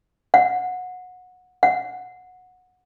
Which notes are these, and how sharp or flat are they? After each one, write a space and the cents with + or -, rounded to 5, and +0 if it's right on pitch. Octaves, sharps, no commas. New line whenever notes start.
F#5 -20
F#5 -15